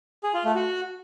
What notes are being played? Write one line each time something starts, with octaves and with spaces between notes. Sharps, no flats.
G#4
F4
A3
F#4